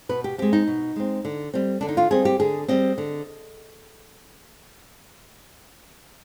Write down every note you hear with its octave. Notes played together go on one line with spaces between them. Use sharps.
B2 B4
G4
G#3 C4 G4
D#4
B2
G#3 C4
D3
G3 C4
D3 D4
D#4
F4
G3 C4 G#4
G4
D3 G#4
G3 C4 D#5
D3